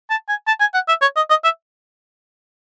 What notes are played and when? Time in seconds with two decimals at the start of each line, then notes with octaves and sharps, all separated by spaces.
0.10 A5
0.29 G#5
0.47 A5
0.60 G#5
0.74 F#5
0.88 E5
1.01 C#5
1.16 D#5
1.30 D#5
1.44 E5